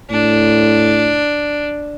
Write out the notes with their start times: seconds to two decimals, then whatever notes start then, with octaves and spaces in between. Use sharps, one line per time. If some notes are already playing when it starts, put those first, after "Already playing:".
0.11 A2 D4